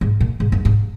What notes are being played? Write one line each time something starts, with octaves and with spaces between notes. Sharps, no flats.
G#2
A#2
G#2
F#2
G#2